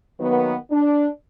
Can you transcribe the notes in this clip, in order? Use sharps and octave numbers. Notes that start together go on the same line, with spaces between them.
D#3 F#3 A#3 B3
D4